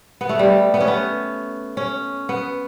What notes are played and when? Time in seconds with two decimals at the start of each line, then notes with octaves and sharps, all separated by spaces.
0.21 B3
0.29 A3
0.39 G3
0.74 B3
0.80 C#4
0.88 B3
1.77 C#4
2.29 B3